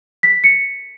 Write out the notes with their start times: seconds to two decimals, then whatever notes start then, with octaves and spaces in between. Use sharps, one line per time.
0.23 B6
0.44 C#7